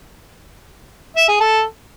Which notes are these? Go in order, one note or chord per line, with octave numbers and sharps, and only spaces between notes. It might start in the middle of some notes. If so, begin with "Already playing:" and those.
E5
G#4
A4